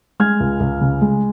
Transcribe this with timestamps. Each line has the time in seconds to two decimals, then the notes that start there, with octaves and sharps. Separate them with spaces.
0.20 G#3 F6 G#6
0.40 C#2
0.60 C#2
0.81 C#3
1.02 G#3